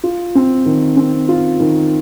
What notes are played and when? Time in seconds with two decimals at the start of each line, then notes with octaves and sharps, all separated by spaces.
0.04 F4
0.35 C4
0.66 D#3
0.97 C4
1.29 F4
1.60 D#3